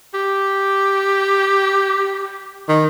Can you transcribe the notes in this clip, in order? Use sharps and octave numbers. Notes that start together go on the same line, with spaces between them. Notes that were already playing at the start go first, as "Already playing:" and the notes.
G4
D#3